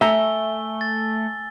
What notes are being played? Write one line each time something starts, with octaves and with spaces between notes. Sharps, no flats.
A3 E5 G#5 A#5 E6 G7
A6